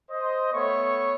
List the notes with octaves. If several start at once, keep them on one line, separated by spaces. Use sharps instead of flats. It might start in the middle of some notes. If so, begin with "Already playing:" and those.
C5 D#5
A3 B3 C#5 C#6